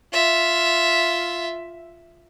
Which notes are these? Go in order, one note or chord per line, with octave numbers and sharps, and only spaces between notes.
F4 E5